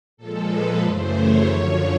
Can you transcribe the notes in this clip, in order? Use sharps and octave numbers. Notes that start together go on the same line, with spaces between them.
A#2 F3 G#3 A4
B4
F#2 C#3 E3 A3 C5
C#5
F#2 D3 F3